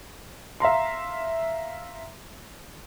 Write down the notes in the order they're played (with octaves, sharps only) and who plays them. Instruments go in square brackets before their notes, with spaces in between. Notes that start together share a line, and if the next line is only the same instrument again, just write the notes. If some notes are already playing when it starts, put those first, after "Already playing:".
[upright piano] E5 F5 A#5 C6